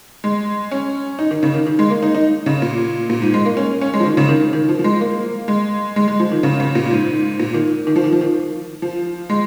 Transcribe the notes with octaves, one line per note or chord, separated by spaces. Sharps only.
G#3
C#4
D#4
D#3
C#3
D#3
D#3
G#3
A#3
D#4
D#4
C#3
A#2
A#2
G#2
G#3
A#3
C#4
C#4
G#3
F3
D#3
C#3
D#3
D#3
F3
F3
G#3
A#3
G#3
G#3
G#3
F3
D#3
C#3
C#3
A#2
G#2
A#2
D#3
D#3
F3
D#3
F3
D#3
F3
G#3